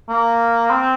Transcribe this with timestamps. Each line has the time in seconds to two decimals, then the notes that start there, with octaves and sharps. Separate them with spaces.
0.09 A#3
0.71 C4